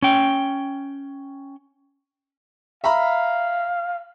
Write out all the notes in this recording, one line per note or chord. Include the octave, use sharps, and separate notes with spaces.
C#4 G5
E5 F5 A#5 B5